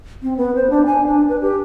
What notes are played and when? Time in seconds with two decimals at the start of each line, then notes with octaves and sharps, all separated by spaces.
0.23 C4
0.37 B3
0.56 C5
0.70 D4
0.86 G#5
1.07 D4
1.29 B4
1.41 G4